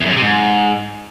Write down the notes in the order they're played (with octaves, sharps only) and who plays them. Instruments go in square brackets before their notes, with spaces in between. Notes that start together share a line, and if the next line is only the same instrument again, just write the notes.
[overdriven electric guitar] E2
F#2
C#3
C3
G#2